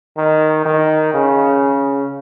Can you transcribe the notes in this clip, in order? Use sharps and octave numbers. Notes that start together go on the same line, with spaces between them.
D#3
D#3
C#3